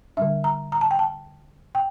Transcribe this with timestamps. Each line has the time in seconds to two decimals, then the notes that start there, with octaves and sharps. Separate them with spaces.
0.17 D3 G3 D4 E5
0.44 A#5
0.72 A#5
0.81 A5
0.91 G5
0.99 A5
1.75 G5